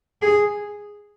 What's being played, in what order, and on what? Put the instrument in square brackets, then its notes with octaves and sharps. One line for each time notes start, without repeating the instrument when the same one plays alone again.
[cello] G#4